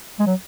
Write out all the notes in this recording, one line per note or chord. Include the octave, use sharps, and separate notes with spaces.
G#3
F#3